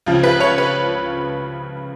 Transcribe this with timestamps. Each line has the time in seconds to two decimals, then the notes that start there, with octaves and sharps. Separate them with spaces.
0.06 C#2 C#3 F3
0.23 B4
0.40 C#5
0.58 B4